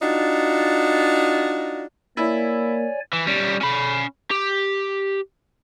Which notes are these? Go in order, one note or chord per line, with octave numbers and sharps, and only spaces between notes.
D4 D#4 F4 F#4
A#3 E4 C#5 D5 G#5
E3
G3 C#4
C#4 B5
G4